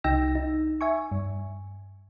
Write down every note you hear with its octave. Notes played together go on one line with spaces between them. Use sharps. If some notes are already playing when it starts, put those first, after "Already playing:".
C2 D#4 G5 E6 A#6
D#4
E5 G#5 C#6
G2